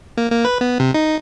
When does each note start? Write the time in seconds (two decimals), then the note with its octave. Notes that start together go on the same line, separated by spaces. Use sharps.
0.17 A#3
0.32 A#3
0.45 B4
0.61 B3
0.80 C3
0.94 D#4